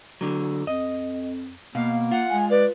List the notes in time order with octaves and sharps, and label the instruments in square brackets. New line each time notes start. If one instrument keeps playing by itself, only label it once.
[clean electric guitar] D3 F#3
[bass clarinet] F2 [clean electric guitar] D#5
[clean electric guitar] B2 [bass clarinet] A#3 [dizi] F5
[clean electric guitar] F4 [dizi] F#5
[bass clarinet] G#3 [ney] G#5
[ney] B4 [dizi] D5